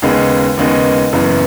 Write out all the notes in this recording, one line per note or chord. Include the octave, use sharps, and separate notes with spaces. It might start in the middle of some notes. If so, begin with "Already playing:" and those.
D#2 C#3 G#3 B3 D#4
D#2 C#3 G#3 B3 D#4
F#1 F#2 C#3 E3 B3